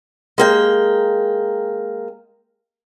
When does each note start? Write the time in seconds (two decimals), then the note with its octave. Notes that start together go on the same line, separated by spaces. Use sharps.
0.38 G#3 A#3 G5